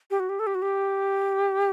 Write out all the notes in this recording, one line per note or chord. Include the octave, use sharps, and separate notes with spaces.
G4
F#4
G4
A4
G4
F#4
G4